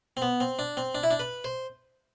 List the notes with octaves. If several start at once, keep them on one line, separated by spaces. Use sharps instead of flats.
C4
B3
C4
D4
C4
D4
E4
D4
B4
C5